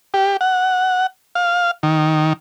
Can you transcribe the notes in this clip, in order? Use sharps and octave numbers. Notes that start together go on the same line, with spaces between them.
G4
F#5
F5
D#3